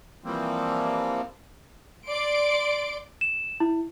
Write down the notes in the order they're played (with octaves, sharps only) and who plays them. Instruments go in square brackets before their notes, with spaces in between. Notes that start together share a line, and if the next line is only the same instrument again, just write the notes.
[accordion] E3 F3 G3 A#3 C4
[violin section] D5 C6 D7
[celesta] E7
E4